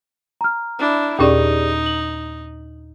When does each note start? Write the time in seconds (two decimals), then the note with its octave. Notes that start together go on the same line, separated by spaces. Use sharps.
0.41 A#5 F6
0.79 D4 E4
1.19 D#2 A#2 C#4 D#4 G4 G#4 D5
1.86 F#7